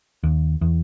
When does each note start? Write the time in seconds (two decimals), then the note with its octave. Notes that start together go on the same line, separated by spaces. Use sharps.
0.23 D#2
0.61 E2